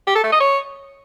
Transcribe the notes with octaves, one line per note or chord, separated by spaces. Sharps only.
G4
A4
A3
D#5
C#5